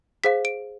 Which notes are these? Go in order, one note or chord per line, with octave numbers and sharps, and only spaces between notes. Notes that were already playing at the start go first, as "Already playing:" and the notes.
G#4 C5 F5 B6
D7